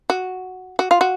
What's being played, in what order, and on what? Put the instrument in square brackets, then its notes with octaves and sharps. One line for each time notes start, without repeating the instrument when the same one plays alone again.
[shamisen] F#4
F#4
F4
F#4